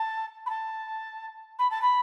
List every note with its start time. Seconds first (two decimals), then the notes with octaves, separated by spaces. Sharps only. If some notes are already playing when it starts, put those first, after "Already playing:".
Already playing: A5
0.46 B5
0.50 A5
1.59 B5
1.71 A5
1.82 B5